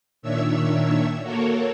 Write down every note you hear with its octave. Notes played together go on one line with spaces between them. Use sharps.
A#2 D#3 D4 C#5 E5 E6
A#3 F#4 A4 A#4 C#5